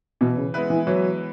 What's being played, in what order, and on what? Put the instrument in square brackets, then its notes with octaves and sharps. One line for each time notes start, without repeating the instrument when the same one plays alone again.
[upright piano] B2 [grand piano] E3
[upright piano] C#3
[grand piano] G#3 B3 E4 B4
[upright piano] E3
[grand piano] E3 [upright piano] F#3